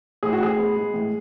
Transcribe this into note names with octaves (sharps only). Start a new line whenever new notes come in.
A2 G#4
F#4
A2 G#4
B3
G#3
A2